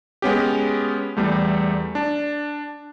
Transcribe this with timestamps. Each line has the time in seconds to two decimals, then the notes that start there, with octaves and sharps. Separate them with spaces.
0.22 G#3 B3 C#4 G4
1.17 E2 G3 A3
1.95 D4